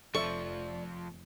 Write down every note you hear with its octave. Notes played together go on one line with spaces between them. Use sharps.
F1 F2 F3 A4 D5 E5 C#6